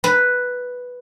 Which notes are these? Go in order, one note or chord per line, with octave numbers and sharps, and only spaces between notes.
B4